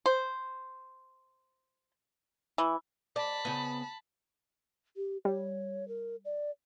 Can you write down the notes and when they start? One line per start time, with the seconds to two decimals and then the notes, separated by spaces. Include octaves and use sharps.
0.06 C5
2.58 E3
3.16 D5 A5 B5
3.45 C#3 B3
4.96 G4
5.25 G3 C#5
5.88 A#4
6.25 D5